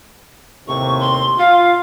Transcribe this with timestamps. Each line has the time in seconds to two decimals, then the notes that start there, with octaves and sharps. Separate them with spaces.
0.68 D#2 A2 C3 C#6
1.00 C6
1.39 F4 F5